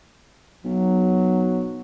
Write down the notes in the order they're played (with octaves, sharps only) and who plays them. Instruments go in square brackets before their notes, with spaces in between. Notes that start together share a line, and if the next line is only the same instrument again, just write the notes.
[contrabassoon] B1 [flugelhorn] F#3